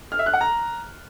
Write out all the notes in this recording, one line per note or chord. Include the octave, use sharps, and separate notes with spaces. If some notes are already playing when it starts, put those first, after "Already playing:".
F6
E5
F#6
F#5
A#5